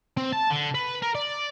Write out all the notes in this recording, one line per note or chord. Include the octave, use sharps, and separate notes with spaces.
C4
A5
D3
B4
A#4
D5